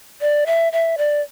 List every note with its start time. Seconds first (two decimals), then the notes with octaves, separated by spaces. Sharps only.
0.21 D5
0.46 E5
0.73 E5
0.98 D5